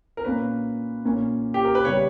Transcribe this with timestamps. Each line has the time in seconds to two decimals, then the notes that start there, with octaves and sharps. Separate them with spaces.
0.17 A#4
0.24 A#2 A#3 C#4 B4
1.05 A#2 A#3 C#4
1.54 G4
1.65 A#4
1.75 B4
1.85 C#3 G3 B3 C#5